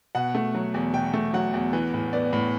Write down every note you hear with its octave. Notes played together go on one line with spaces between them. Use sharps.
B2 F#5
A3
F#3
E2
B2 G5
A3
F#3 F#5
E2
E3
A2
B3 D5
A2